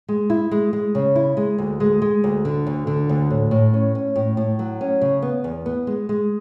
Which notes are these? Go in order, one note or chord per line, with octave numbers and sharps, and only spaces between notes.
G#3
E4
G#3
G#3
C#3
E4
G#3
D2
G#3
G#3
D2
D3
D2
D3
D2
A2
A2
C#4
C#4
A2
A2
F#3
C#4
C#3
B3
E2
B3
G#3
G#3